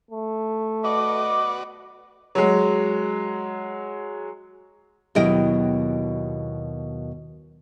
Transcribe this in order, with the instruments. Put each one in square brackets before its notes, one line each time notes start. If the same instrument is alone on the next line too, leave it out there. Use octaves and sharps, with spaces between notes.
[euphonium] A3
[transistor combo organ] F#4 B4 D5 [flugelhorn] D#5 [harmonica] D6
[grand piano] F#3 G#3
[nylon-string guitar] D#2 B2 F#3 E4 D#5 G5